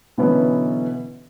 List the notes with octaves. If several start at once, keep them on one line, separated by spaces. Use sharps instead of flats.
B2 D3 E3 F#3 B3 C#4